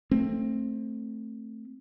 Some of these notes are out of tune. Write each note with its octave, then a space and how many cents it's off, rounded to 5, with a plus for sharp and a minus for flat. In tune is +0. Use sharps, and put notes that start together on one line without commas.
A3 +10 C4 +15